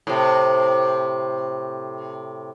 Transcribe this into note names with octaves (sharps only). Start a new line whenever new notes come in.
A2 C3